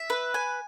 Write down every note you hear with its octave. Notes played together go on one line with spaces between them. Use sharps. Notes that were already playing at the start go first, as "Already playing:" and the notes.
Already playing: E5
B4
G#5